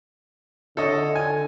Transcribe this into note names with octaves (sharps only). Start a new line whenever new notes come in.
D3 A4 C#5 D#5
G#5